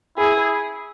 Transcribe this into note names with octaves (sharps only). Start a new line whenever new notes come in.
E4 G#4